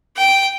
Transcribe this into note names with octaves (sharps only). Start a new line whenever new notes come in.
G5